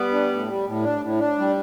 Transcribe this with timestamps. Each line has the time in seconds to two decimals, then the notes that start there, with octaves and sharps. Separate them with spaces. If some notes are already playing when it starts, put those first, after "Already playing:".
Already playing: G3 B3
0.12 D4
0.30 A2
0.47 G3
0.66 A2
0.83 D4
1.02 A2
1.19 D4
1.38 G3